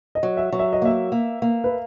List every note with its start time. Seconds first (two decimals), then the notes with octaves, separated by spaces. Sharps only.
0.15 D#5
0.23 F#3
0.37 E5
0.52 F#3
0.59 E5
0.73 D#5
0.82 A#3 E5
1.12 A#3
1.42 A#3
1.64 B4